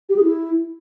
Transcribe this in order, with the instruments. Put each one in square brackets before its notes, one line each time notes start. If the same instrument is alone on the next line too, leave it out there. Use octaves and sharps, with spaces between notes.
[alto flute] G4
G#4
E4